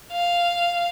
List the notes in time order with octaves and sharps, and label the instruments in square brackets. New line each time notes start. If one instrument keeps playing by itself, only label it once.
[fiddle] F5